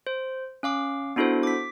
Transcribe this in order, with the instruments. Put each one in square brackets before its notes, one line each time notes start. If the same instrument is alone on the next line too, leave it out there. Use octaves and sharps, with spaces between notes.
[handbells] C5
C#4 F5 D6
B3 D4 E4 F#4 A4 C5
D6 B6